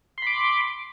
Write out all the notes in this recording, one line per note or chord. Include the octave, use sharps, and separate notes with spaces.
B5 C6 D6